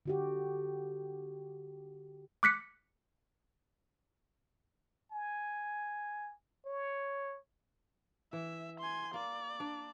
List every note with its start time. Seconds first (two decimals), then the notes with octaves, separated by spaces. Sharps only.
0.06 D3 F#4 G4
2.43 D6 F#6 B6 C#7
5.12 G#5
6.66 C#5
8.33 E3 E5
8.80 G#5 C6
9.14 A#3 D5
9.60 D4